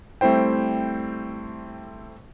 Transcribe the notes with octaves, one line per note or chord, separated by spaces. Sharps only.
G3 A3 C4 E4 C5 G5